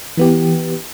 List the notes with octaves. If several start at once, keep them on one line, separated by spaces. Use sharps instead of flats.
E3 B3 G4